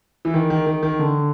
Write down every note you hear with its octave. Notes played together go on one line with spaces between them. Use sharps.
E3
D#3
D#3
D#3
D#3
D3